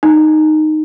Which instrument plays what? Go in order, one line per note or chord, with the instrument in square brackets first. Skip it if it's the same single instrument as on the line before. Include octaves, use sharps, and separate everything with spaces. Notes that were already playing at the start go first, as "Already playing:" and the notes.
[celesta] D#4